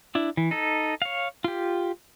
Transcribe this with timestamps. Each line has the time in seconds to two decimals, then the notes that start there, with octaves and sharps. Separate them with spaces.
0.15 D4 E4
0.37 E3
0.51 D#4 A4
1.02 C#5 F5
1.44 F4 G4